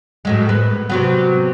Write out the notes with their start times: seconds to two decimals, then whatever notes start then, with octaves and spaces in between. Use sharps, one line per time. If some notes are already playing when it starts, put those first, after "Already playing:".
0.25 F#2 A2 G#3
0.49 B3
0.90 C3 F#3 B3